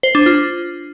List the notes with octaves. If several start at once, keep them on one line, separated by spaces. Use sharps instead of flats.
C5
D4
F4